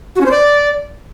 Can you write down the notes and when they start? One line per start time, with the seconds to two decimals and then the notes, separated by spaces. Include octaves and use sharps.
0.16 F#4
0.21 C#4
0.26 C5
0.31 D5